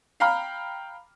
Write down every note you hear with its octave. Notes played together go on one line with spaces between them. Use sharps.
F5 G5 A#5 B5 F6